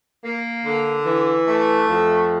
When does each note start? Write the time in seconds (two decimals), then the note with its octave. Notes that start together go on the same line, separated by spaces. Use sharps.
0.23 A#3
0.64 D3
1.05 E3
1.46 A3
1.87 F2